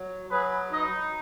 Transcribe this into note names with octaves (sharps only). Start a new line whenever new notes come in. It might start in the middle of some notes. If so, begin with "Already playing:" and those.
Already playing: F#3
F#3 G#4 B4
D#4 B4 D#5